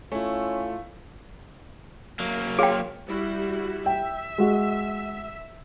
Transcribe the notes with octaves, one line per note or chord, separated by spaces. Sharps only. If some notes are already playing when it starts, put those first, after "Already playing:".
A3 C#4 E4 F4
F#3 A#3
G#4 C#5 F5 G5 C6
G3 E4 F#4
E5 G5
G#3 F#4